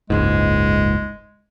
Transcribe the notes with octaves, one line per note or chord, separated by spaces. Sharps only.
F#1 C#2 G#2 G#3